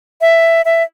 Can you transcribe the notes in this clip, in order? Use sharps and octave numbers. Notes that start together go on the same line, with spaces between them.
E5
E5